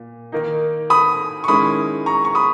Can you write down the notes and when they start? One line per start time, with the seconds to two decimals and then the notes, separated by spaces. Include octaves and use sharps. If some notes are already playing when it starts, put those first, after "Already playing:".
Already playing: A#2
0.32 D#3 A#3 D#4
0.90 B5 D#6
1.44 C#6
1.48 D#3 G#3 C#4 E4 B5 D#6
2.06 A#5 C#6
2.25 C#6
2.35 B5 D#6